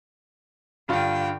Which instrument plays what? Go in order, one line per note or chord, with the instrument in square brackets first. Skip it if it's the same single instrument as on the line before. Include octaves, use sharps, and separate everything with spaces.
[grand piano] G2 F4 [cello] D3 G5